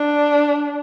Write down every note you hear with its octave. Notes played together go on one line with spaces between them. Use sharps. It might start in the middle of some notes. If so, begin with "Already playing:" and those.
Already playing: D4